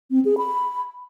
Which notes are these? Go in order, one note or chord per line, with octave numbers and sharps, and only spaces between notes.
C4
G#4
B5